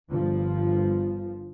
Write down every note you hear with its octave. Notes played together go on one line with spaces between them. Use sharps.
G1 F3